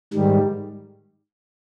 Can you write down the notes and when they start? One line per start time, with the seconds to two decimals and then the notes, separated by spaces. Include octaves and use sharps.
0.14 G#2 D#3 G3